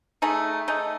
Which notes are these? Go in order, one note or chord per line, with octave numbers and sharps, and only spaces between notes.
A3 D#4 G#4
A3 D#4 G#4